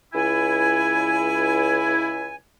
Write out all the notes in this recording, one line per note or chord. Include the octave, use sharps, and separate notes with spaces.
C#2 E4 G#5